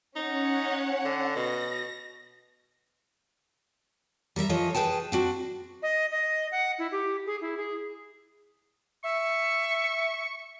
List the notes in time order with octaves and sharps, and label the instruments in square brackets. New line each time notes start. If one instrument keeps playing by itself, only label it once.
[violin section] C#4 C#5 F#5 [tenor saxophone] D#4
[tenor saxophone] D3
[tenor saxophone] B2 [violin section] A#6
[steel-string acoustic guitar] G3 A#4 B4 E5
E3 F3 A4 C#5 D#5
G#4 A#4 B4 G5 A5
C4 D4 F#4
[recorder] D#5
D#5
F#5
E4
G4
G#4
E4
G#4
[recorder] E5 [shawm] C#6